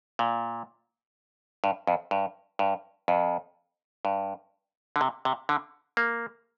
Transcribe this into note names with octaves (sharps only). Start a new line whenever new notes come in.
A#2
G2
F2
G2
G2
F2
G2
D3
C3
C3
D3
A#3